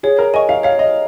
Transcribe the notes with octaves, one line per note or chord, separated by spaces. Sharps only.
G#4 C#5
A#4
D#5 G#5 C#6
F5
C#5 F5
D#5